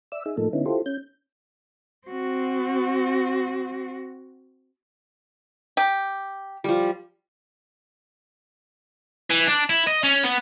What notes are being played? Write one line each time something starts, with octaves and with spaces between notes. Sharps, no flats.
D5 E5 E6
D#4 G#4 E5
A2 F3 A3 A#3 D#4 A4
D3 B3 C#4 D#4 E4
E4 F4 G4 A4 C5
C#4 G6
C4 F#4
G4
F3 G3
E3
D4
E4
D#5
C#4
B3